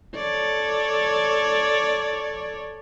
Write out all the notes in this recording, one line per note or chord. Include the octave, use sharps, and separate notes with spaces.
A4 C#5 D5